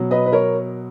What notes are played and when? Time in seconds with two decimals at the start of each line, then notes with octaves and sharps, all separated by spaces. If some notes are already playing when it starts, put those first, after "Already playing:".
Already playing: B2 F#3
0.11 B4 D#5
0.26 B4
0.33 A#4 C#5